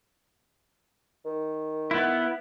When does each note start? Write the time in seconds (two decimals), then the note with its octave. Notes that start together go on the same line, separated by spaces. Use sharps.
1.25 D#3
1.91 B3 E4